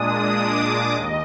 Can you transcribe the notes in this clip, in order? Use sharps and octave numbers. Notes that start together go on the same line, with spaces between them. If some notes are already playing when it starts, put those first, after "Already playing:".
Already playing: A#2 G#3 D4 D#6
D6
D#2 D#5